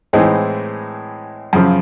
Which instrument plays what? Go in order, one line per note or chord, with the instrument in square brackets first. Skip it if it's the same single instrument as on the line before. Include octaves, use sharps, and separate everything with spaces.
[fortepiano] A2 E3 G#3 C4 D#4
F#2 C#3 F3